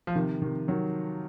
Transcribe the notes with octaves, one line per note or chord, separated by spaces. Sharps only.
F3
C3 D#3
C3 D#3
D#3 F#3